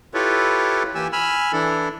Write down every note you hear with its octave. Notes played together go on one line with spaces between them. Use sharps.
E4 F4 G4 A4 B4 C#5
E3 A#3 G4 G#5 E6
G#5 B5 E6 F6
E3 D4 E4 A4